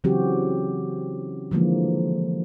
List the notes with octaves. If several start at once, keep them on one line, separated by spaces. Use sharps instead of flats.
C#3 E3 F#3 C4 F#4 G4
D3 E3 F3 G#3 A#3